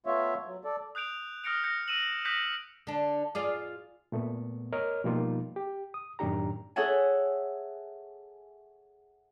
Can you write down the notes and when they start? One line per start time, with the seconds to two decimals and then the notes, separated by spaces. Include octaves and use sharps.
0.06 A3 B3 F4 C#5 E5
0.45 F#3
0.64 A4 D5
0.95 D#6 F#6 G6 D7 F7
1.44 D#6 F6 A#6 C#7 D7 F7
1.63 F6 G6 A#6 C#7
1.88 E6 D#7 E7 F#7
2.25 D#6 F#6 G6 A#6 B6 C#7
2.87 D3 D4
3.35 F4 G#4 D5
4.12 A#2 A3 B3
4.73 A#4 C#5 D#5 F6
5.04 B2 F3 G3 A#3 D#4 F4
5.56 G4
5.94 D#6
6.19 F#2 A2 D#3 D4 G4 A#5
6.76 G#4 A4 C#5 E5 F#5 G#5